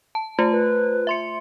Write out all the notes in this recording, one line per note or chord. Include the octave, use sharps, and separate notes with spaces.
A5
A3 F4 C5
B4
E5 C6 C#7